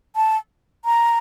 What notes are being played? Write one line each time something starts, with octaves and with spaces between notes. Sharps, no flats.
A5
A#5